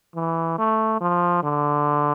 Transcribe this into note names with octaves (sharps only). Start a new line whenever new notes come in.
E3
A3
F3
D3